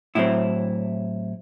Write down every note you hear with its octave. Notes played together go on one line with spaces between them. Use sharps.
A2 F#3 C4 E4